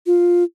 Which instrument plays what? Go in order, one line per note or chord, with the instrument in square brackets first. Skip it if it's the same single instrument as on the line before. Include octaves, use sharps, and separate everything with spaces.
[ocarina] F4